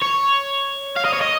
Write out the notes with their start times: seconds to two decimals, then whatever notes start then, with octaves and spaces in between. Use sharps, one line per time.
0.02 C#5
0.97 F5
1.05 D#5
1.14 C#5
1.21 D#5